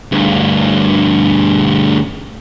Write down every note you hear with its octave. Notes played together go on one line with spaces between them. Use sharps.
D2 G2